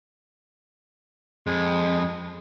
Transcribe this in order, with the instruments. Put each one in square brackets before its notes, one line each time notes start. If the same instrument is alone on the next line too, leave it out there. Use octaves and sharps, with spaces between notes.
[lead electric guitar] F2 [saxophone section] G#3